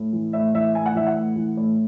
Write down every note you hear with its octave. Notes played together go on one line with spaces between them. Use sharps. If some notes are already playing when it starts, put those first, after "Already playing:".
Already playing: A2
E3
A2 E5
E3 E5
A2 G#5
F#5
E3 E5
F#5
A2
E3
A2